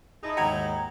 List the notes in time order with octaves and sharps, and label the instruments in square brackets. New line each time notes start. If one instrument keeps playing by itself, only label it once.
[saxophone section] D#4 E4 [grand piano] G#4 A5
[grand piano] D#2 G#2 C#7 [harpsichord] F#3 [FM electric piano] G5 A#5 G#6